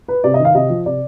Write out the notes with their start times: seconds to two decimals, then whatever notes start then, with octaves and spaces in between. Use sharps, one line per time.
0.08 B4
0.24 C3 D5
0.34 D#5
0.40 D#3
0.45 F5
0.55 C3 D#5
0.70 F3
0.86 C3 D5